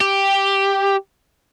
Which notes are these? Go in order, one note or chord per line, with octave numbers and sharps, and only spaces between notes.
G4